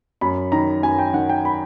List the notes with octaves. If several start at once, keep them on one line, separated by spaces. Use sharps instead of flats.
F#2 B5
D#3 A#5
F#2 G#5
G5
D#3 F#5
G5
B5